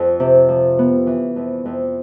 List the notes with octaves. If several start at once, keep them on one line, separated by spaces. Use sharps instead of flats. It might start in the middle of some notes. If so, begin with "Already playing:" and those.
Already playing: F2
C3
F3
B3
E3
F2
F2